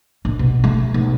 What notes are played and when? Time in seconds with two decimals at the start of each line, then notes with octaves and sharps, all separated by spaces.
0.25 A#1
0.39 B2
0.64 A3
0.94 B1